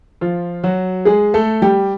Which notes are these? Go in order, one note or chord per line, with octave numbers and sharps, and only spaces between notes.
F3 F4
F#3 F#4
G#3 G#4
A3 A4
G3 G4